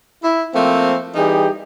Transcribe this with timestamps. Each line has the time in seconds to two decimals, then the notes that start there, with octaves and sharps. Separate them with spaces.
0.23 E4
0.55 F3 A3 A#3 C4
1.15 E3 G3 D#4 G4 G#4